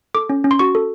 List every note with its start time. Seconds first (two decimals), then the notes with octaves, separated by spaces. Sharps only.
0.14 A4 D6
0.29 C#4
0.44 C#4
0.51 C6
0.59 F#4 C#6
0.75 A4